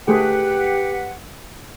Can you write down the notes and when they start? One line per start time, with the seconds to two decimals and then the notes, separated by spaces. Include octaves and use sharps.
0.08 A3 G4 G#4 B4 F#5